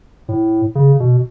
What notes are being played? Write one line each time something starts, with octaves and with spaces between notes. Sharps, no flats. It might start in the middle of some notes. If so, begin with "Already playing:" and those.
A2
C#3
B2